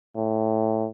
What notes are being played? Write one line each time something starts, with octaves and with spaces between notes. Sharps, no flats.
A2